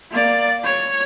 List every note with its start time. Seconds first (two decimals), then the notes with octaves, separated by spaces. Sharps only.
0.11 A#3 D5
0.63 C#5